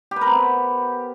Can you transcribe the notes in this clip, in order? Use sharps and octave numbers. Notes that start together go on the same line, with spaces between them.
G4
B4
A#4
C4
B3